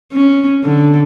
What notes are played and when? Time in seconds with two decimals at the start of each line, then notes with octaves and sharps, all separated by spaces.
0.13 C#4
0.64 D3